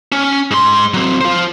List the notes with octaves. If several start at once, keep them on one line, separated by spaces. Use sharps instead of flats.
C#4
G#2 C6
F#3 C4
F4 C5